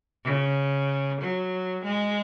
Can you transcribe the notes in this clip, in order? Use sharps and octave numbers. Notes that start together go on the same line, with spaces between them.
C#3
F#3
G#3